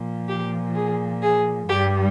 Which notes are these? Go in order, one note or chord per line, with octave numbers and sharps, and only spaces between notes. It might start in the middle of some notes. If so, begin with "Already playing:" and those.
Already playing: A#2 F3
G4
G#4
G#4
G2 G3 G4